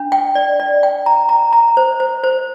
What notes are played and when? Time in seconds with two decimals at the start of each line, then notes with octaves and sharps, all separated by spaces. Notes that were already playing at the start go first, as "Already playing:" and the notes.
Already playing: D4
0.12 G5
0.35 D5
0.60 D5
0.83 G5
1.06 A#5
1.29 A#5
1.53 A#5
1.77 C5
2.00 C5
2.24 C5